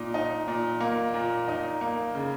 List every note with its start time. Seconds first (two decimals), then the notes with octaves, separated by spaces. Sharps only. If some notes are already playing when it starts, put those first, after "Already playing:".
Already playing: A#2 D#4
0.14 D#4
0.48 A#2
0.80 A#3
1.14 A#2
1.48 D#4
1.81 A#3
2.15 C#3